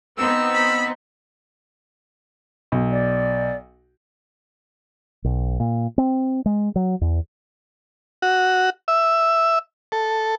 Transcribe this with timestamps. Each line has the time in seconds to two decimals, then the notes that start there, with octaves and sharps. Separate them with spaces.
0.18 B3 C4 D#4 E6
0.54 B5
2.72 B1
2.91 D5
5.24 B1
5.60 A#2
5.98 C4
6.46 G#3
6.76 F#3
7.01 E2
8.22 F#4
8.88 E5
9.92 A4